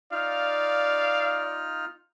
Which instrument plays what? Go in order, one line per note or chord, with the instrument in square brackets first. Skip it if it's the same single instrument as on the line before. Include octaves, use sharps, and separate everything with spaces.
[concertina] D#4 F4 F6 [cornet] D5 [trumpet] F5